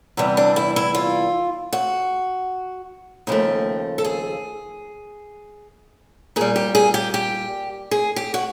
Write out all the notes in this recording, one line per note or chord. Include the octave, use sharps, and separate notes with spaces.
E2 C3 E3 G3
D4
E4
E4
F4
F#4
D#2 C#3 F3 A3 G4
A4
G#4
A#2 G3 G#4
G4
G#4
G4
G4
G#4
G4
F#4